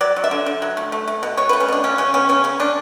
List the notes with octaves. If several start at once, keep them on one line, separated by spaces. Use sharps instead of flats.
F#3 D5
F#3
E5
D3
D3
F#3
A3
A3
A3
B2
B2 C#5
A3 B4
C#4
B2 D4
F#3 C#4
C#3 C#4
B3 C#4
C#3 C#4
C#3 C#4
C#3 D4